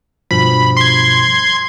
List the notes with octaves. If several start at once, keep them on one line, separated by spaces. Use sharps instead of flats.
G2 B2 F3 B5
C6 G#6